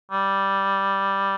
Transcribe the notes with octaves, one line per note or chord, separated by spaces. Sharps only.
G3